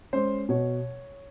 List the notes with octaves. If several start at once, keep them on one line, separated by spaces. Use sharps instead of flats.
G#3 C#4 C5
B2 C#5